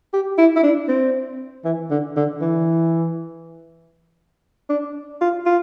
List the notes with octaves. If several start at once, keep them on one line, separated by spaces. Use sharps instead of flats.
G4
E4
E4
D4
C4
E3
D3
D3
E3
D4
F4
F4